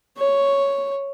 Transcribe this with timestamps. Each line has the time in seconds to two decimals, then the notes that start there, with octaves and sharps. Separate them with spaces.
0.19 C#5